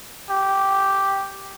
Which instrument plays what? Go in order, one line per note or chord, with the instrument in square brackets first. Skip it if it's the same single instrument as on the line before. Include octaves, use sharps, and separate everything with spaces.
[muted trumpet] G4